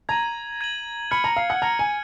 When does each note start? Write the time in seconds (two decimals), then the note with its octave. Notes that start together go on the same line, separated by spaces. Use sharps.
0.09 A#5 G#6 D#7 F#7
0.61 G#6 D#7 F#7
1.11 B5 F6 G#6 C#7
1.24 A#5
1.37 F5
1.50 F#5
1.62 A#5 F6 G#6 C#7
1.79 G#5